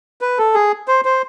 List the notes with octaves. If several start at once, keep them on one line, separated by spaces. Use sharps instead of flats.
B4
A4
G#4
C5
C5